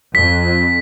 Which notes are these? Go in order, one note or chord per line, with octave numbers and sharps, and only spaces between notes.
F2 B6